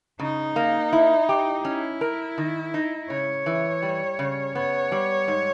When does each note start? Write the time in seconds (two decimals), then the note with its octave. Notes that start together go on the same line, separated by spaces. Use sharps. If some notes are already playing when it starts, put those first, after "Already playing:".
0.19 C#3 D#4
0.56 A#3
0.93 E4
1.29 G4
1.65 C#4 E4
2.01 A#4
2.38 D#3
2.74 D#4
3.10 C#3 C#5
3.46 E3
3.83 G3
4.19 C#3
4.55 B3 C#5
4.92 G3
5.28 G#2